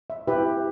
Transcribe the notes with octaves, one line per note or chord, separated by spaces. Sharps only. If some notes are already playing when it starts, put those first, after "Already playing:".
E5
E4 G4 B4 E5